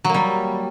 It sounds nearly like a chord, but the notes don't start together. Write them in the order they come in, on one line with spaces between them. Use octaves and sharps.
F#3 A#3 G3